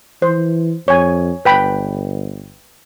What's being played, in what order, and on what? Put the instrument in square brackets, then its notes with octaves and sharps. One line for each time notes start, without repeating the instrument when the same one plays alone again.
[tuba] E3 [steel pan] C5
[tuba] F2 [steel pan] C#5 G#5
[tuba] G1 [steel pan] B4 G5 B5